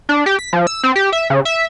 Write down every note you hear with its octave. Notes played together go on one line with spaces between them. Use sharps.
D4
G4
B6
F3
E6
C4
G4
E5
C#3
E5